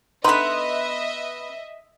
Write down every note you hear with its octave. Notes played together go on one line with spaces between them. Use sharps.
D3 B3 D#4 B4 D#5 E5 C6